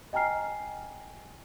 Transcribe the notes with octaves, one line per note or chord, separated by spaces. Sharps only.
D#5 G5 G#5 A#5 F6 C7